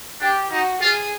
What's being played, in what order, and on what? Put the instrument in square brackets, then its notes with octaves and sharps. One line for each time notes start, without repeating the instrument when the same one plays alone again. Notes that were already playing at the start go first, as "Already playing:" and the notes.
[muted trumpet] D4 [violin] G4
[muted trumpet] D#4 [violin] F#4
[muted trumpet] F4 [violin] G#4